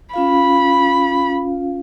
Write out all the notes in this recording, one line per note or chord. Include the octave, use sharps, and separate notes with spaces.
C#4 F4 F5 B5